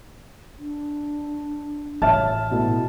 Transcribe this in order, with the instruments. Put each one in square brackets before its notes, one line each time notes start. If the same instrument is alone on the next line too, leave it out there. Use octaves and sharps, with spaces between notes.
[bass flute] D4
[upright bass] A1 [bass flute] C#5 [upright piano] E5 F6 [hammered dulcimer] A5
[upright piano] B2 A3 [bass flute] E4